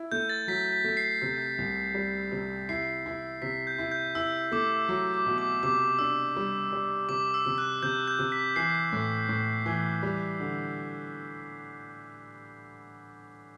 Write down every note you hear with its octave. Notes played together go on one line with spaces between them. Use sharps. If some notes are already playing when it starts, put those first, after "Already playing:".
Already playing: E4
A3 G6
A6
F#3 B6
B6
A3
C7
C3
C2
G3
C3
E4 C7
E4
C3 B6
G6
E4
G6
E4 E6
A3 D6
F#3 D6
D6
B2
D6
C3 D6
D4 E6
G3
G3
C3 D6
E6
C3
F#6
C3 G6
G6
C3
B6
E3 C7
A2
A2
E3
G3
D3